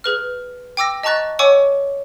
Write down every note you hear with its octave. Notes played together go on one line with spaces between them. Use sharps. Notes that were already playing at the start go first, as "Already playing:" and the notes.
G#4 B4 F6
G5 D6 E6 A#6
D#5 A5 A#5 C#6 F#6 A6
C#5 F#5 G#5 C#6 D6 E6